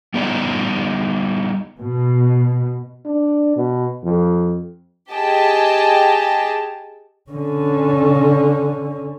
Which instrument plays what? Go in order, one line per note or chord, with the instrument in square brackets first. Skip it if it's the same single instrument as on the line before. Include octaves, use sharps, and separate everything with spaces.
[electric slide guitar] G3 B3 D#4 D5
[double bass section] B2
[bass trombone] D4
B2
F2
[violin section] G4 G#4 D#5 G5 A5
[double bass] D3 C#4